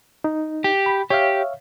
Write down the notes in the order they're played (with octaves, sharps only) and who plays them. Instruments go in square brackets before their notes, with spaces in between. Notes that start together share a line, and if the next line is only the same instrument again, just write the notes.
[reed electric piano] D#4
[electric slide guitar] G4
[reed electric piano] B5
[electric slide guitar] G4 [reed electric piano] C#5 E5 F5